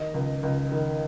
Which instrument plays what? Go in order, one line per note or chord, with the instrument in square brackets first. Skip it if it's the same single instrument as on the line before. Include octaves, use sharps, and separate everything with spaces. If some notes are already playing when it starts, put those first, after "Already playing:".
Already playing: [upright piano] D#3 D#5
C#2
C#2
D#3